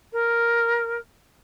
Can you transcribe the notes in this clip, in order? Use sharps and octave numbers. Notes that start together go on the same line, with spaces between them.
A#4